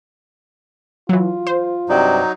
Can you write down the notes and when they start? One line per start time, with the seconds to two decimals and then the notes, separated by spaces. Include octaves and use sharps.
1.09 E3 F#3 F4
1.47 C5
1.89 G2 C3 F#3 D#4 D5